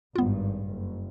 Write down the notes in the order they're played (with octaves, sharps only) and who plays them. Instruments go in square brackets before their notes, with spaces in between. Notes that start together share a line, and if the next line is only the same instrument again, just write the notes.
[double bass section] G#1 G2 [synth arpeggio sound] B3 F4
[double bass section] F#1